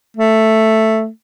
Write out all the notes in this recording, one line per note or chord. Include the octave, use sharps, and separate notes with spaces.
A3